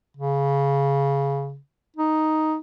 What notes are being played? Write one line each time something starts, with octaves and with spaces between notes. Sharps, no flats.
C#3
D#4